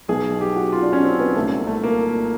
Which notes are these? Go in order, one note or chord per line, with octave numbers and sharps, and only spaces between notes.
B1 B2 G#4
G4
F#4
F4
D4
C#4
C4
B3
C2 A#2 A3
A3
A#3